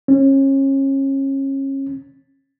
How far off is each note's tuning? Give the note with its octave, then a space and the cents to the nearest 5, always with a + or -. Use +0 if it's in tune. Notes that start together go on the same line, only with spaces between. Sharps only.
C#4 -30